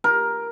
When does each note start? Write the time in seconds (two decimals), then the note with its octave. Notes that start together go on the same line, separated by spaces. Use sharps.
0.04 A#4